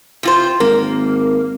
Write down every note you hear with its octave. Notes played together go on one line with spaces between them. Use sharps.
C3 F4 C5
G#1 A#3 A#4